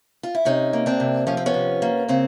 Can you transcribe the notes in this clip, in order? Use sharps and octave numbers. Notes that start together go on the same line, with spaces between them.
F4
E4
C3 C#4 D#4
A#3
C4 D4
C3
F3 C#4
C4
B3 C#4
C3
A#3
C#3 C4